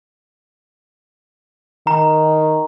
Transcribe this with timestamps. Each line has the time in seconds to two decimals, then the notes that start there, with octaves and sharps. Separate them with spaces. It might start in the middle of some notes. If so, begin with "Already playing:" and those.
1.87 D#3 A#5